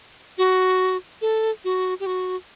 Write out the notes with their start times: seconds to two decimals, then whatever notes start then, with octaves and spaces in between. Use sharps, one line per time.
0.38 F#4
1.22 A4
1.64 F#4
2.00 G4
2.06 F#4